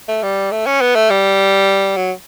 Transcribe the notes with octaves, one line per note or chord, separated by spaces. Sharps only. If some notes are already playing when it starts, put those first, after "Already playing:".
A3
G3
A3
C#4
B3
A3
G3
F#3